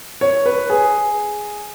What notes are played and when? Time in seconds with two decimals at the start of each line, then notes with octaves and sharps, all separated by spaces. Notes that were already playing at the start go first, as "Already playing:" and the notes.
0.21 C#5
0.46 B4
0.70 G#4